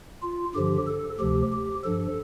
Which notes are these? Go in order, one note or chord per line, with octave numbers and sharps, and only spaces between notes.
F4
G2 D3 F3 G4
A4
D2 C3 F3 G4
G4
G2 F3 A4